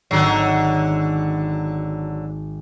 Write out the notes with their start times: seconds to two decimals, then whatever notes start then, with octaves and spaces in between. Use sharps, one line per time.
0.11 G#1 D3 D#3 F#3